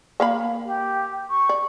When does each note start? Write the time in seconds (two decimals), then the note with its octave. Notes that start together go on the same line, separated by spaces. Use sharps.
0.20 A#3 F5 B5
0.65 G4
1.30 C#6
1.49 D5